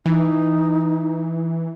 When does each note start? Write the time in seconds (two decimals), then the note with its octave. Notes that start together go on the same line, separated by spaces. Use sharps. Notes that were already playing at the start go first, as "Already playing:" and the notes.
0.06 E3 D#4